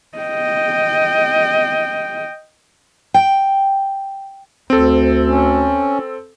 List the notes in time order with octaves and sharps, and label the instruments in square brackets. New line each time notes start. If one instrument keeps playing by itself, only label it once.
[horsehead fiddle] D#5 G5
[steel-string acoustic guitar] G5
[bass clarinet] D2 [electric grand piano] C4 A4
[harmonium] C#4